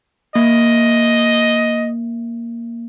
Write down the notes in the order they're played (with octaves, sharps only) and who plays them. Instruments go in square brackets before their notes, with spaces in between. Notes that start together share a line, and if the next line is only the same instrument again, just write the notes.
[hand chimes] A#3 [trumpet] D#5